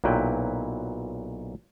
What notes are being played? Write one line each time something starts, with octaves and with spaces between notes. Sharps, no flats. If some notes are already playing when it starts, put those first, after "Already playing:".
B1 A#2 F#3 E4 B4 G5